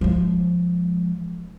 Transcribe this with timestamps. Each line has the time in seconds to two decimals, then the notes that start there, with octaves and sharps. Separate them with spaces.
0.01 F3 G#3